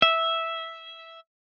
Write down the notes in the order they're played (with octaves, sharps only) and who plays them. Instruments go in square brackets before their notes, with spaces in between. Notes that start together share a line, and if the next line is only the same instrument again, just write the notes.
[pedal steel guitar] E5